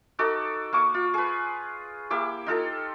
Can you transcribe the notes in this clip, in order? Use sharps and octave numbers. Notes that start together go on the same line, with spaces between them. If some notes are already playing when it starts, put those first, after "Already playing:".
D#4 F#4 A4 D6
A#3 C#6 D6
F4
G#4 B4
A#3 E4 G4 D6
D#4 F4 A4